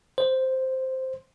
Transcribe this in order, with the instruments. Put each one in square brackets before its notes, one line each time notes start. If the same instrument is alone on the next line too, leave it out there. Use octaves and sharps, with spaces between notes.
[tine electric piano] C5